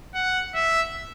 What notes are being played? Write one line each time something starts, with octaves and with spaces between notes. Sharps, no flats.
F#5
E5